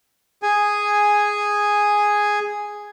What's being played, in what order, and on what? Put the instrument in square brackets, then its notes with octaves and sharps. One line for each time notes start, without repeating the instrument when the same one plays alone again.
[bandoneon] G#4 G#5